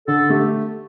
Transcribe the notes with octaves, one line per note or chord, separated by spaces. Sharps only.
D3 A4
A3 G4